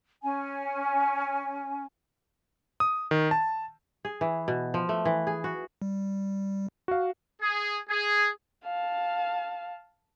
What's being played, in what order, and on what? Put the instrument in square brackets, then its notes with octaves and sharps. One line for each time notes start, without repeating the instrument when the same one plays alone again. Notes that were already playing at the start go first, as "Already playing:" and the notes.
[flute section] C#4 G#5
[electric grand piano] D#6
D#3
A5
[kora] G#4
E3
B2
F3
A3
E3
G#4
F#4
[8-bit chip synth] G3
[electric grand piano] F#4 F5
[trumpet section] G#4
G#4
[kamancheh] F5 A5